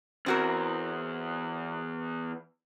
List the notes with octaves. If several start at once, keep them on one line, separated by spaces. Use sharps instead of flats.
E2 C4 F#4 A#4